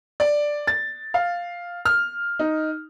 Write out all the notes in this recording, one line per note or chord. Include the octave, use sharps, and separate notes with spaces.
D5
A6
F5
F6
D#4